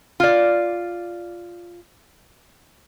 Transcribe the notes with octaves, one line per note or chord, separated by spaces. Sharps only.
F4 D5